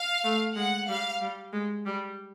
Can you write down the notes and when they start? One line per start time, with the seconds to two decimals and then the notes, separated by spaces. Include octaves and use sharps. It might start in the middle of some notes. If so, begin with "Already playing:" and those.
Already playing: F5
0.24 A3
0.56 G#3 F#5
0.88 G3 F5
1.21 G3
1.53 G#3
1.86 G3